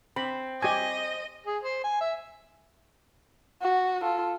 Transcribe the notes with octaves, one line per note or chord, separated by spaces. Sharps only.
C4 B5
G4 D#5 G#5
G#4
C5
G#5
E5
F#4
F4 A4